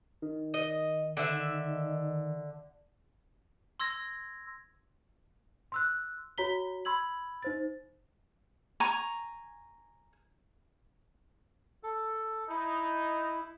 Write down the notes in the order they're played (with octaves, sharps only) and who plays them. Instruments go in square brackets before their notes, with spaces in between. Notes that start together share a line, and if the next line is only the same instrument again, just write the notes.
[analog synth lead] D#3
[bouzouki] D#5
D3 E5
[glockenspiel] C6 E6 G#6 A#6
[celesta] C6 E6 F#6
F#4 C#5 A#5 B6 G7
B5 C6 E6 G#6 F#7
D#4 C5 A6
[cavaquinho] G#5 A#5 C#6
[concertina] A4
[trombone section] D#4 [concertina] E4